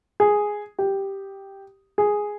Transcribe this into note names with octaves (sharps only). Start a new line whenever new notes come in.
G#4
G4
G#4